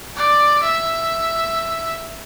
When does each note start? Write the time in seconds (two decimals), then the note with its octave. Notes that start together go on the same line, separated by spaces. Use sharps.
0.16 D5
0.64 E5